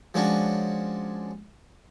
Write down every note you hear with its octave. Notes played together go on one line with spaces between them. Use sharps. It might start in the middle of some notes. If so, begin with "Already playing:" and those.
F3 G#3 C#4 D4 F#4